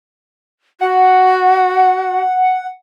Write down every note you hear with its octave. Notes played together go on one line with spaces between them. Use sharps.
F#4 F#5